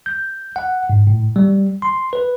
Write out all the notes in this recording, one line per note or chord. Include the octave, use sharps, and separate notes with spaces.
G6
F#5
G#2
A2
G3
C6
B4